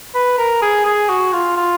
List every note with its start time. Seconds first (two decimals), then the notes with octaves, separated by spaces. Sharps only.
0.15 B4
0.38 A#4
0.62 G#4
0.85 G#4
1.09 F#4
1.33 F4
1.57 F4